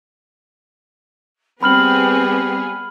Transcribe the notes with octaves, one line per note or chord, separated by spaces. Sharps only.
G3 B3 C4 G#4 B5 F6 F#7